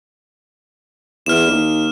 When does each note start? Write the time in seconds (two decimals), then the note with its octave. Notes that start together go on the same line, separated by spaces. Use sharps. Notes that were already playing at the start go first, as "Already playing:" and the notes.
1.26 E2 F6 E7
1.47 D#2